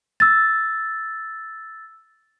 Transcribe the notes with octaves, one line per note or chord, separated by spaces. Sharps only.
E6 A6